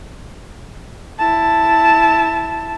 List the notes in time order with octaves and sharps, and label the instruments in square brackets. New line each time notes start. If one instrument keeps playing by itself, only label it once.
[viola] E4 A5